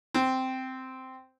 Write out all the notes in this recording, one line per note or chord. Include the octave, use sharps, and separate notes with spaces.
C4